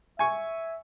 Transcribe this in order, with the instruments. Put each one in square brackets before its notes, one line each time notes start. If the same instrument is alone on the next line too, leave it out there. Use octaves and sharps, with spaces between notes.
[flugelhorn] E5 [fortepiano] G#5 C#6